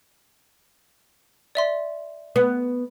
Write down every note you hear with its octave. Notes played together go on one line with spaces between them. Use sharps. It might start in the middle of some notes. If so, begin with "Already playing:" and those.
D5 E5 C6
B3